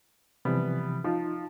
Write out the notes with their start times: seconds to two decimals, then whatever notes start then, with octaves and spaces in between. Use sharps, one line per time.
0.45 C3 E3 F3 G3 B3
1.04 F3 D#4 F4